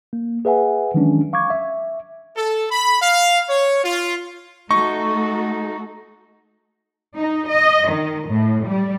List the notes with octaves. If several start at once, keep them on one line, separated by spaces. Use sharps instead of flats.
A#3
G#4 B4 E5 F#5 G#5
D#3 E3 F#3 G#3 C#4 D4
F5 C#6 D6 G#6
E5
A4
B5
F5
C#5
F4
A3 D#4 F#4 A4 C#6
D#4
D#5
D#3
A2
G3